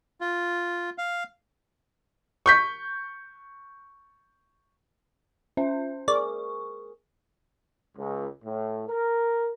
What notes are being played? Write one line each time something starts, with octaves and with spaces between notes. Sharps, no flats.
F4
F5
C#6 G6 B6
C#4 C5 E5
G#4 A#4 D5 C#6
C#2
A2
A#4